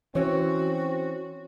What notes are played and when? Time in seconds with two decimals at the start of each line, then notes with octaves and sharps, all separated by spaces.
0.15 E3 C4 C#4 F#4 C#5